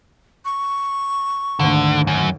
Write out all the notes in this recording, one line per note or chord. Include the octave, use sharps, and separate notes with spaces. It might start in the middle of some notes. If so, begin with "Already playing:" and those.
C#6
G#1 D2 D3
F#2